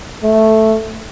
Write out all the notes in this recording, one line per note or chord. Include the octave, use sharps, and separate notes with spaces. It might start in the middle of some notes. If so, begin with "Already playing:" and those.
A3